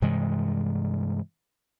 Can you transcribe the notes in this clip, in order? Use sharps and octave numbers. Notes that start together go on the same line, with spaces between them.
G2 C3 E3 G#3